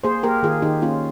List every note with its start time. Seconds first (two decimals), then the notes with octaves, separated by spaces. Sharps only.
0.04 A#3 G#4 C5
0.23 A#3 G4 A#4
0.43 D#3 F4 G#4
0.62 D#3 D#4 G4
0.82 A#3 C#4 F4